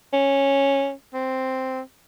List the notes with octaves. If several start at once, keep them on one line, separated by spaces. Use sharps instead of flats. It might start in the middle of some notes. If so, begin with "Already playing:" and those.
C#4
C4